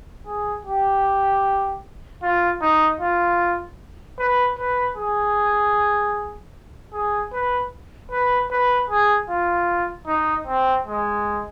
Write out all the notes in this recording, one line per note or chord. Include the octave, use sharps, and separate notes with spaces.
G#4
G4
F4
D#4
F4
B4
B4
G#4
G#4
B4
B4
B4
G#4
F4
D#4
C4
G#3